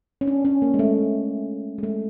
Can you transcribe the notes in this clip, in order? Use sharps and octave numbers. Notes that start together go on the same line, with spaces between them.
C#4
D4
C#4
A#3
G#3
A3
G#3
A3